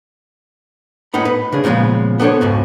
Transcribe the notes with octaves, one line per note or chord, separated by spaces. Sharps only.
A2 B3 D#4 B5
B4
C#3 D4 G#4
A#2 C#3 F3 G#3 B3
B3 D4 A4 C5 C#5
C#2 G#2 B2